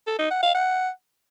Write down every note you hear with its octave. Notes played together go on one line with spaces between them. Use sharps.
A4
D#4
F#5
F5
F#5